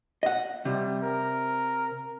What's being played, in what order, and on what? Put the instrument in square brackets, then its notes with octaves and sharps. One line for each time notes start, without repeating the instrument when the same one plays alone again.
[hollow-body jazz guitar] D#5 F#5
[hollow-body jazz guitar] C3 [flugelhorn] G3
[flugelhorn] A#4